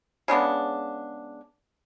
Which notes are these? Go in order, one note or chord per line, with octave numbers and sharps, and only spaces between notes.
C#3 G#3 B3 D4